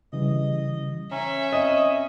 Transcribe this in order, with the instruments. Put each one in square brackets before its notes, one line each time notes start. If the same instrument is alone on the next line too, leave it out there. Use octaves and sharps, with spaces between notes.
[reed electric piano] C#3 E3 G3 [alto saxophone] D#5
[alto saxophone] C#4 [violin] E5 [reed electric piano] A#5
[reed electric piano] C4 [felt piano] D#5